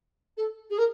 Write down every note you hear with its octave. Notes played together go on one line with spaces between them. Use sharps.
A4
G#4
A#4